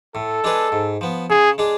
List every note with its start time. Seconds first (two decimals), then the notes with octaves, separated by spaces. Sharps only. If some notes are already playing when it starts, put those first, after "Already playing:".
0.15 A2 A4
0.44 G#3 D4 G#4 B4
0.72 G#2
1.01 F3 B3
1.30 C#3 G#4
1.58 G#3 D4 G#4